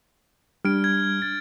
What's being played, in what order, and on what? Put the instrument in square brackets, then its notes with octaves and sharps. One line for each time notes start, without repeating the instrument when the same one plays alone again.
[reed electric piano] G3 D4 [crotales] F6 G#6 D7
[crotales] G#6
A6